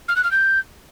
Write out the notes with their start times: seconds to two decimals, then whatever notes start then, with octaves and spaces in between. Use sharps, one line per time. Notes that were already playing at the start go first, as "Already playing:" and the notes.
0.08 F6
0.16 F#6
0.24 F6
0.31 G6